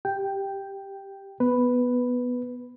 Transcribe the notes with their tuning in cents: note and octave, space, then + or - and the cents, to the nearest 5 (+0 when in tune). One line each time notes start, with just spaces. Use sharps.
G4 +0 G5 +0
B3 +0 B4 +0